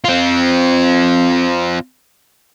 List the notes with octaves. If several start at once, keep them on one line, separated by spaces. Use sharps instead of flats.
C4 F4